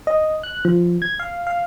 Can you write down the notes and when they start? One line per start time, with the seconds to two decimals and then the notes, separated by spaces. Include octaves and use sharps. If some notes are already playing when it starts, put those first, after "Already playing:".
0.07 D#5
0.43 F#6
0.65 F3
1.02 G#6
1.20 F5
1.47 F5